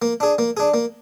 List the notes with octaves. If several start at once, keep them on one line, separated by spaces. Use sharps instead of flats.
A#3
D4 G#4
A#3
D4 G#4
A#3